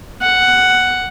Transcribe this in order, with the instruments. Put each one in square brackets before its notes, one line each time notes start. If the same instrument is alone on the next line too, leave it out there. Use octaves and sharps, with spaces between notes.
[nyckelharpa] F#5